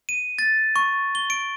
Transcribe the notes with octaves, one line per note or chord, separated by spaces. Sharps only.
D#7
A6
C#6
G7
D7